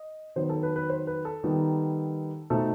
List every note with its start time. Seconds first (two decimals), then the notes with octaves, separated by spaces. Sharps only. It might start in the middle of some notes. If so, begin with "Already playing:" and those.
Already playing: D#5
0.36 D#3 F#3 B3 D#4 C5
0.50 A4
0.63 B4
0.76 B4
0.90 C5
1.07 B4
1.25 A4
1.44 D#3 G3 B3 D#4
2.50 B2 A3 C4 D#4 A4